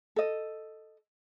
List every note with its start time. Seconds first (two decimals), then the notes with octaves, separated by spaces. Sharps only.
0.16 A4 D#5